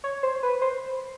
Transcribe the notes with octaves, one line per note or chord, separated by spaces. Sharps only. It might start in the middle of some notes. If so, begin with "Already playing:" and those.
C#5
C5
B4
C5